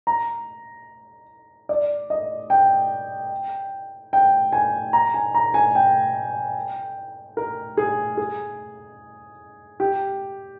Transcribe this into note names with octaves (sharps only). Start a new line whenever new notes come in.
A#5
D5
D#5
G5
G5
G#5
A#5
G#5
A#5
G#5
G5
A#4
G#4
G#4
G4